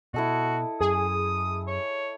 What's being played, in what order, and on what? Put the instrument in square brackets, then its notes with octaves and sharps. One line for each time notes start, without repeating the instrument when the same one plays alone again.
[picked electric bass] B2 [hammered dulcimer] E4 A4 D#5 [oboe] F#4
[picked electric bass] F#2 [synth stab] G#4 [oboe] D#6
[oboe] C#5